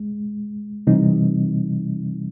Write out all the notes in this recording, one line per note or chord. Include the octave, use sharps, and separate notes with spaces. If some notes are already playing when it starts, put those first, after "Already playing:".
Already playing: G#3
C3 E3 G3 C4 D#4